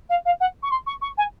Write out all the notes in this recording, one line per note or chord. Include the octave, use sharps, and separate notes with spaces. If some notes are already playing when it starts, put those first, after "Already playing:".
F5
F5
F#5
C#6
C6
C#6
C#6
G#5